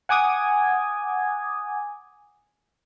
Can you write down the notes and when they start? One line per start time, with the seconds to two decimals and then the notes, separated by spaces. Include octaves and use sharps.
0.09 F#5 G#5 D6 D#6 G#6